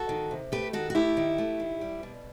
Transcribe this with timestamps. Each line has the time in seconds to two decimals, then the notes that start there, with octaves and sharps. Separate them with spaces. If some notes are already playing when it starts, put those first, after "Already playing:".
Already playing: F#4 A4
0.09 D#3
0.31 C3
0.52 A3 G4 B4
0.73 D#3 F#4 A4
0.90 F#4
0.95 A3 E4 G4
1.17 D#3
1.38 A3
1.60 D#3
1.81 G3
2.03 B2